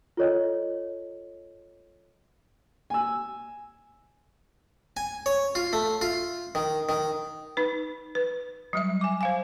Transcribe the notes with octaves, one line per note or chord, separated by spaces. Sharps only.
F4 A4 C#5 D#5
G#5 E6
G#5
C#5
F4
A3
F4
D#3
D#3
D#4 B4
B4
F#3 G3 E5
G#5 D6
C5 F5 G#5